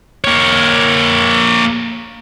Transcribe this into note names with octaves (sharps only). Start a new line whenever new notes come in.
A#3 C#5